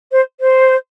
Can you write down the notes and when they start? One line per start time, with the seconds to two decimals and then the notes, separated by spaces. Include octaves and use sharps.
0.12 C5
0.40 C5